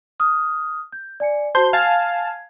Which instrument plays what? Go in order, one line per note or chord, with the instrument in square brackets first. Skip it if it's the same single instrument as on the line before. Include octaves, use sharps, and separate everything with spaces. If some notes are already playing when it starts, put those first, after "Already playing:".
[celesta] D#6 F6
G6
D5 G#5 C#7
[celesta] F#4 A5 [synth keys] C5 C6 G6
[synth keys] F5 G#5 A5 [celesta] G#6